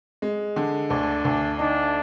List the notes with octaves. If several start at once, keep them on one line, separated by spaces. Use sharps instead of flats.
G#3
D3
D2 D4
D2
D4 D#4